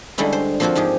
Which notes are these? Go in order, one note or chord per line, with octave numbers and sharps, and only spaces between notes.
D3 G3 G#3 C#4 E4
C5
F3 A#3 C4 F4 F#4 C5
G#2 F3 G4 G#4